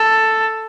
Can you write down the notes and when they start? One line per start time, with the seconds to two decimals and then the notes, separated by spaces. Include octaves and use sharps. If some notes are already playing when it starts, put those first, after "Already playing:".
Already playing: A4